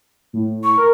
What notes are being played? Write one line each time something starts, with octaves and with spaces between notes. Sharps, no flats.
A2
C#6
A#4